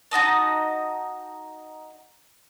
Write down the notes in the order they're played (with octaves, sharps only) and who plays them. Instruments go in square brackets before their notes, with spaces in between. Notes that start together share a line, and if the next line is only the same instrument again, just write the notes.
[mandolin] D#4 F#4 D#5 A5